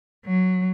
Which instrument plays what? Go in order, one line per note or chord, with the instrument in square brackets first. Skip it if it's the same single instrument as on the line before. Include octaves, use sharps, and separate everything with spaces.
[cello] F#3